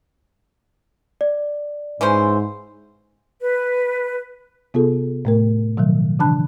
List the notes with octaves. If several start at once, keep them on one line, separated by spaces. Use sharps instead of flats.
D5
G#2 E3 C#4 C5
B4
C3 B3 F4 G#4 A4
A2 A3 A#4
B2 D#3 F3 F#3
C#3 E3 D4 A5 B5 F#6